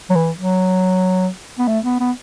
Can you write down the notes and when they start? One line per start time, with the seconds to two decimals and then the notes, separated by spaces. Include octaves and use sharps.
0.10 F#3
0.15 E3
0.36 F#3
1.59 B3
1.68 A3
1.85 B3
2.00 B3